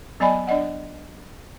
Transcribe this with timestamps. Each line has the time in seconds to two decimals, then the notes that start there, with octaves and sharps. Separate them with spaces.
0.20 F#3 B3 D5 D#5 G#5 B5
0.47 D4 D5 D#5 F#5